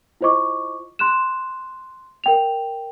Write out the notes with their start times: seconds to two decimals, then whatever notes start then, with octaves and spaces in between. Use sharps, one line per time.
0.21 E4 F4 C5 D#5 C#6 D6
0.99 C6 F#6 E7
2.24 A#4 G5 F7